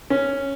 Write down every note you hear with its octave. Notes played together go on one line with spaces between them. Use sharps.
C#4